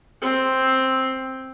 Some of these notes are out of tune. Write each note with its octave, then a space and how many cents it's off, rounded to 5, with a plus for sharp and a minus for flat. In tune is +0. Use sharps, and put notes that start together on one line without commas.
C4 +5